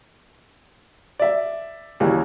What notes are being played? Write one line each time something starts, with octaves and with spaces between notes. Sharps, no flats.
D5 E5
D#2 C#3 E3 G3